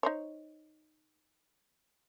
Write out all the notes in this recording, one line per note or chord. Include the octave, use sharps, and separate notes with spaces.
D#4 C5 C#5